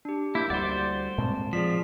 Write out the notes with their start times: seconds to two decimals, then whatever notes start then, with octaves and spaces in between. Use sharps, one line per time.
0.05 D4 G4
0.35 A#3 E4 D6 G6
0.50 D2 G3 C5 D5 F#5
1.18 A#2 G#3 C4 A5
1.53 F3 G#4 D5 B6